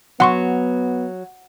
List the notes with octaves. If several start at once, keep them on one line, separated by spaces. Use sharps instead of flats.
F#3 B3 F#5 C6 C#6